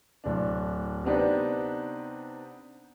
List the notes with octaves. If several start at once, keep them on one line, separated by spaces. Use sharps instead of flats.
D1 D4
C3 B3 C4 D4 D#4 B4